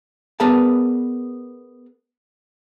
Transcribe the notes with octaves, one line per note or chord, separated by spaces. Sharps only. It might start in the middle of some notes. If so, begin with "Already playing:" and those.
B3 G#4 A#4 B4 D5 A5